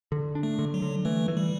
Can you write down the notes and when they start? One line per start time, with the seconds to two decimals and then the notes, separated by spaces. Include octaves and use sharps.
0.12 D3
0.35 D4
0.43 A3
0.59 D3
0.74 F#3
0.82 D3
1.05 E3 A3
1.28 E3
1.37 G3